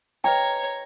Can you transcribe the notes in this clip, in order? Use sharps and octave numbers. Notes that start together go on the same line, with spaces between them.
B4 C#5 D#5 G5 A#5